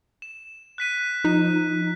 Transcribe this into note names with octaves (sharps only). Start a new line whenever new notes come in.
E7
F#6 B6 D#7
F3 D#4